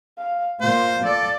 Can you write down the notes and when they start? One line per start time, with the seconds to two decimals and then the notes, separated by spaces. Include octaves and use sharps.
0.19 F5
0.61 A#2 F4 C5
1.05 A4 D5